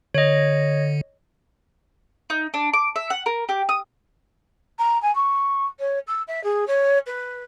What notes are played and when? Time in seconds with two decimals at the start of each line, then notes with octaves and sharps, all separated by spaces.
0.14 D3 C#5 D#5
2.30 D#4
2.54 D4
2.73 D6
2.96 E5
3.10 F#5
3.26 A#4
3.49 G4
3.69 D#6
4.79 A#5
5.02 G#5
5.15 C#6
5.79 C#5
6.07 E6
6.28 E5
6.44 G#4
6.67 C#5
7.06 B4